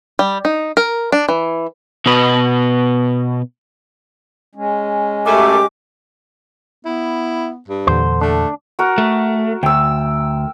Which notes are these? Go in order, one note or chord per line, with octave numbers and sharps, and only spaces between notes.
G3
D#4
A#4
D4
E3
B2 B4
G#3 C#4
F#2 A3 G4 D6
B3 E4
G2
E2 A#2 D3 C5
A3 D4
F#4 A#4
A3
D2 G5 E6